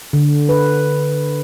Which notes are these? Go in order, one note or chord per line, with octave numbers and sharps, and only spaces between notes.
D3
B4